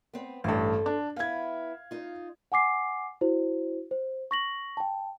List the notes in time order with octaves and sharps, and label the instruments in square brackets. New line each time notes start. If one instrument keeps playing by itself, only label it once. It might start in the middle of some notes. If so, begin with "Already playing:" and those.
[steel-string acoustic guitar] B3 C4
[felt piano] A1 G2 [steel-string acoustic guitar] A4 C5
[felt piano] D4
[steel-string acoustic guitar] B3 E4 [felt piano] F5 G#6
[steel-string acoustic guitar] D#4 F4
[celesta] F#5 G#5 D6 C7
E4 F#4 C5
C5
C#6 A#6 F#7
G5 A5